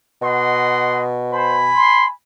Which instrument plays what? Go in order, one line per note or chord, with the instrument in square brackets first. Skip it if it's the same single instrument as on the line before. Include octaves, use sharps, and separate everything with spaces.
[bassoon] B2 [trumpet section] D#5 F#5 C6
[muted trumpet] C5 [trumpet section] G#5 B5
[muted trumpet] C6